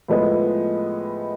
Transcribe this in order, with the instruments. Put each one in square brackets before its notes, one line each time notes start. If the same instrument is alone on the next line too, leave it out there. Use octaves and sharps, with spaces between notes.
[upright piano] A2 F3 G#3 B3